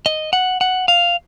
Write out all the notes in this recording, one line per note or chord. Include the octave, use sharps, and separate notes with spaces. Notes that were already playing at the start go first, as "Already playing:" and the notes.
D#5
F#5
F#5
F5